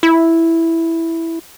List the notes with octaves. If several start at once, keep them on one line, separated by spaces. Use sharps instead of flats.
E4